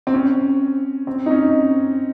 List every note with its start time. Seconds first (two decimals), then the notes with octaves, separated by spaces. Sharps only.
0.07 C4
0.14 C#4
1.07 C4
1.26 D#4
1.30 C#4